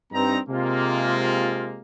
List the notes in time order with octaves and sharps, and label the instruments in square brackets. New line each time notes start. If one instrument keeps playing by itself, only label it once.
[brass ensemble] G2 D#4 A#5 [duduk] C4
[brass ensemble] C3 G#3 A#3 [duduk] F4